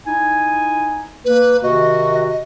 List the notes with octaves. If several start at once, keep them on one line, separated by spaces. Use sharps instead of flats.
D#4 E4 G#5
A#3 B4
C3 D#3 F#4 D#5